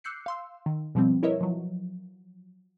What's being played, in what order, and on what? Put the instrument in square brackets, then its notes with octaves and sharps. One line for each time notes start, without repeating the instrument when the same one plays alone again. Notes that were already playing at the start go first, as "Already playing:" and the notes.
[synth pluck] D6 E6 F#6 G6 C7 C#7
F5 C6 E6
D#3
B2 F3 G3 C4
E4 A#4 B4 C#5 D#5 E5
F3 F#3